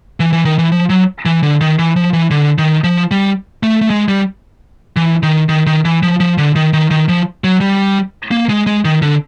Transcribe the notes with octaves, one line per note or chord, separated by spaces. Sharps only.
E3
E3
D#3
E3
F3
F#3
E3
D3
D#3
E3
F3
E3
D3
D#3
F3
G3
A3
A3
G#3
G3
E3
D#3
D#3
D#3
E3
F3
F3
D3
D#3
D#3
D#3
F3
F#3
G3
A#3
G#3
G#3
D#3
D3